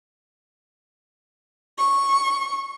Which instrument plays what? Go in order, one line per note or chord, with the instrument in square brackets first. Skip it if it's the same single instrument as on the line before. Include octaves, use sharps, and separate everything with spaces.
[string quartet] C#6